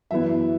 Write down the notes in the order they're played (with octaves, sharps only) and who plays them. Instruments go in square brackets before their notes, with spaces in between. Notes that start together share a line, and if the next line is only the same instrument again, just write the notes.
[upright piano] F#2 E3 B3 E4 E5